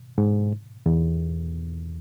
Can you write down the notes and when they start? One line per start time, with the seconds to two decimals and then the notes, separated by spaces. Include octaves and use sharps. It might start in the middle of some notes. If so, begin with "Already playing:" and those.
0.18 G#2
0.86 E2